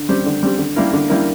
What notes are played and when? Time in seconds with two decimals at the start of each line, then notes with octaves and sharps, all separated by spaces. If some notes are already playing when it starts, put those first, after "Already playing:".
Already playing: D3
0.09 G3 C4 G4
0.26 D3
0.43 G3 C4 G4
0.59 D3
0.76 G3 A#3 E4 A#4
0.93 D3
1.09 G3 A#3 E4 A#4